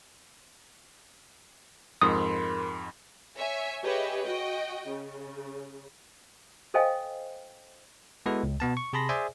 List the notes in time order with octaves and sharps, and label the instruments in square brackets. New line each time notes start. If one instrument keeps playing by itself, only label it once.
[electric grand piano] F2 G#2 [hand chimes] A#4 B5 C6 [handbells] D#6
[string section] C#5 E5 G#5
G4 G#4 B4 C#5 D#5 E5
F#4 D#5 G5
C#3
[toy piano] A4 C5 D#5 F5 G5 G#5
[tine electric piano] G#3 B3 E4 F#4 A4 B4
C#2
B2 B3 A5
C#6
C3 G#4 A5 B5 C6 A#6
G#4 C5 D5 E5 G#5